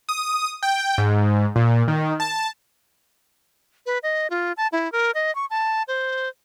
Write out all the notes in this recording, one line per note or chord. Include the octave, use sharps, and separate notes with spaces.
D#6
G5
G#2
A#2
D#3
A5
B4
D#5
F4
A5
E4
A#4
D#5
C#6
A5
C5